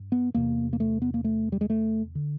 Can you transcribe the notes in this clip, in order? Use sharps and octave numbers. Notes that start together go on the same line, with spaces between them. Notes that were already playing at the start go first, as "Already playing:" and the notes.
Already playing: G2
B3
E2 C3 A#3
A#3
A3
B3
A#3
A3
G3
G#3
A3
D3